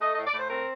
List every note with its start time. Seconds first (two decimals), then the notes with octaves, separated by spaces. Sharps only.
0.01 A3 D#5
0.14 D#5
0.18 A2
0.26 D5
0.34 A2 C5
0.50 C4 A#4